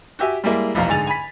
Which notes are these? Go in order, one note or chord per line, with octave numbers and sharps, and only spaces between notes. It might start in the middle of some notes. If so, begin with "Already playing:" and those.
F#4 G4 E5 G#5
G3 G#3 A#3 E4
F1 B1 E2 F3 F5 A#5
G#2 D3 G#4 G#5 A6 F7
G#5 B5 B6